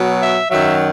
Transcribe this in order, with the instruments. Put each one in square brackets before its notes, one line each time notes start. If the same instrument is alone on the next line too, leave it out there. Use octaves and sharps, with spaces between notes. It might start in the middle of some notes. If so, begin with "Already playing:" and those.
Already playing: [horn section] B2 F#3
E5
F#2 D#3 F#3 E5